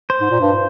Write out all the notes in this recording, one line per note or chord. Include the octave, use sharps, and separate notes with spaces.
C5
G#2
A#2
G2